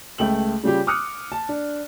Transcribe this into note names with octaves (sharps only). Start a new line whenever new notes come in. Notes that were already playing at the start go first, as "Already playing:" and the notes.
C#2 A3 G5 F#7
C#3 G3 F4 G4
D6 D#6 F6 F#6 C#7
A5
D4